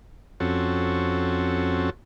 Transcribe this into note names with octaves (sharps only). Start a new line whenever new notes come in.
F2 C4 C#4 F#4 A4